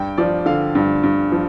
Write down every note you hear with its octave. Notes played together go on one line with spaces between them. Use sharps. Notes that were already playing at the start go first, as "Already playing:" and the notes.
Already playing: G2 G5
F3 D5
D3 F5
G2
G2
F3